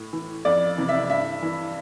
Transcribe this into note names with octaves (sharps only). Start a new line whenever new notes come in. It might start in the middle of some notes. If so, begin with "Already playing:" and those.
Already playing: A2
E3
F2 D5
C3 E3
E5
G2 E5
E3